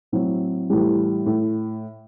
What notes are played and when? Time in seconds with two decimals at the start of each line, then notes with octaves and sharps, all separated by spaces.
0.12 A2 F#3 C4 E4
0.70 A2 E3 G3
1.26 A2